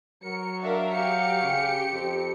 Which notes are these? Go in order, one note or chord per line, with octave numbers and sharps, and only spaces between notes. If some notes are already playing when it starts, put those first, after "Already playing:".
F#3 A#4 C#7
D4 A#4 E5 F5
G4 F5 C#7
C#3
F2 C4